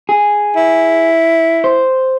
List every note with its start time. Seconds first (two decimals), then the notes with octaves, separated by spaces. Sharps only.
0.09 G#4
0.56 E4
1.64 C5